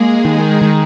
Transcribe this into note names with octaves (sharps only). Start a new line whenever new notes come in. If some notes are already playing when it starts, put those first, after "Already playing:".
Already playing: G#3 A#3 G#4
D#3
D#3